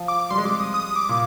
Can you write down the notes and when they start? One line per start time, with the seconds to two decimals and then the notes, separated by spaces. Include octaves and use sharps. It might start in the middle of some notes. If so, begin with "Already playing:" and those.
Already playing: F3
0.08 D6
0.31 G3 C6
0.38 G#3
0.45 G3 D6
0.60 D#6
0.74 D#6
0.96 D6
1.09 A#2